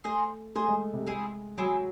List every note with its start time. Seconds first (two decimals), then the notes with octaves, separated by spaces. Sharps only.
0.04 A3 G#4 C5 D#5
0.55 A3 G#4 C5 D#5
0.68 G#3
0.93 C3
1.07 G#3 C4 E4 G#4
1.58 F#3 C4 E4 G#4